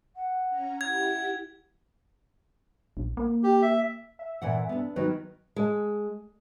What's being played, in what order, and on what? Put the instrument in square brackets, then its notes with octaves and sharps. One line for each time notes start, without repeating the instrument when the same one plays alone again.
[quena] F#5
[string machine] C#4 A#5
[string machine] E4 G4 [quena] F#5 [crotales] G#6
[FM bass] A#1
A#3
[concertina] G4
E5
[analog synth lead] E5
[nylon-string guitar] A#2 E3 F#5
B3 D4
[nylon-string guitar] D#3 F#3 [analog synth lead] B4
[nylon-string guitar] G#3